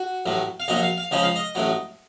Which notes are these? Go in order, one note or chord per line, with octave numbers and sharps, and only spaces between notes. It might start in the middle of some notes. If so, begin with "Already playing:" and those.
Already playing: F#4
A1 A2 F#3
F5
A#1 A#2 F#3 D#5
F5
F5
C#2 C#3 F3 D#5
F5
D#5
A1 A2 F#3